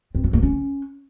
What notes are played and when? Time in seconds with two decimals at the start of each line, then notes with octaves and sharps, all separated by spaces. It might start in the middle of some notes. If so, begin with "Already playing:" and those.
0.15 C4
0.24 E3
0.33 A#3
0.43 C#4